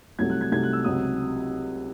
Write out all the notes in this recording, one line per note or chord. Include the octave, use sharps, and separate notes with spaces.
C2 C3 F#3 A3 G#6
F#6
G#6
C2 C3 F#3 A3 G#6
F#6
E6
C#2 C3 F#3 C4 D#6